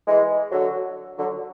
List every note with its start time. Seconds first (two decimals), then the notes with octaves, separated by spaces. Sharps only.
0.07 E3 G#3
0.51 D3 F#3
1.18 D3 F#3